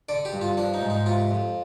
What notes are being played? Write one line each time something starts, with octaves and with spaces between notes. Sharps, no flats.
D3 D5
G4
G2
F4
F3 D4
D#4
G#2
D#4
C3 F4
F2